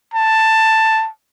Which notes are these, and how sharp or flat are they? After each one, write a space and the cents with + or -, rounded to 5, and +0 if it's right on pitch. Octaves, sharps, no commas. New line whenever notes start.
A5 +10